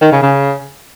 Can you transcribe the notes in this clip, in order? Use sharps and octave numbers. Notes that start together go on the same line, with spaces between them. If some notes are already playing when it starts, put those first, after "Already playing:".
D#3
C#3
C#3